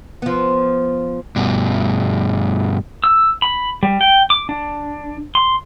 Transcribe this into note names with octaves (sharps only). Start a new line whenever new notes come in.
F3 B3
G2 B2
E6
B5
G3
G5
D6
D4
C6